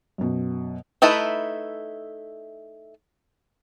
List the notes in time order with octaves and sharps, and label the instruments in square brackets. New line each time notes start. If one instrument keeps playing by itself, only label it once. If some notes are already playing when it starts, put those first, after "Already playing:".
[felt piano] F#2 B2
[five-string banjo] A3 D#4 E4 A4 B4